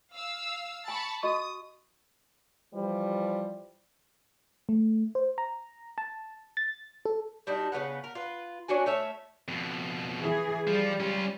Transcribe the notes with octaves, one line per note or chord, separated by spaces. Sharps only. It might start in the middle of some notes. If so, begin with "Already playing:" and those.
F5 E6
G#5 A5 B5 C#6
F#4 D#5 C#6 D#6
E3 F3 G3
A3
C5
A#5
A5
A6
A4
G3 D4 D#4 F#4
C#3 G3 B3 F#5
A#4
F4 B4
C#4 D4 F#4 G#5
A3 C#5 E5 F5
F2 B2
E3 G#4
F3 G3
C#4 F4